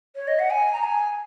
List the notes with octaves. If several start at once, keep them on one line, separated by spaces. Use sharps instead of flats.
C#5
D#5
F#5
G#5
A#5
G#5